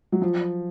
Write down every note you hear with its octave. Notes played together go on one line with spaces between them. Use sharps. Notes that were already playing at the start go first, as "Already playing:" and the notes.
F#3
F3